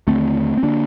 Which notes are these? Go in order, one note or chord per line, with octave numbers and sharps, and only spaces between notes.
D#2 D3 A3 C4
C4
D3 A#3 D4